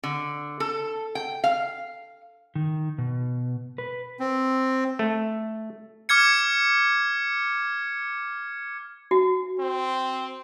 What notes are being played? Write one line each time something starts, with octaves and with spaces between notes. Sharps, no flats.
D3
A4
G5
F5
D#3
B2
B4
C4
A3
D6 F6 G#6 C#7
F#4
C4